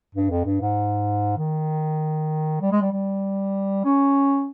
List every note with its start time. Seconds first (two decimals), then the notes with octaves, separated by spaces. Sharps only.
0.15 G2
0.30 F2
0.45 G2
0.61 G#2
1.37 D#3
2.61 G3
2.72 G#3
2.81 G3
2.92 G3
3.85 C#4